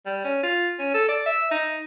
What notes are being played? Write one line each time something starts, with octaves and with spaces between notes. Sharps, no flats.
G3
C#4
F4
C#4
A4
D5
E5
D#4